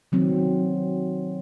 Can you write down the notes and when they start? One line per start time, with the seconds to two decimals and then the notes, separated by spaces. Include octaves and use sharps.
0.12 D#3 F#3 C4